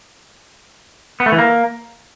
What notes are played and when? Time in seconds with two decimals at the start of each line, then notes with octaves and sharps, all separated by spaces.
1.20 B3
1.26 A3
1.32 E3
1.38 A#3